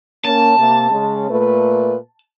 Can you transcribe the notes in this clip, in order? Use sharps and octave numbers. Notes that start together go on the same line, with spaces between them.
A#3 C#4 A5
C3 A#3
C#3 G#3 C#4
A#2 A3 B4